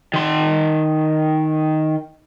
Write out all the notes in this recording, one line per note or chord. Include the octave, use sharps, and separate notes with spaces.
D#3 C6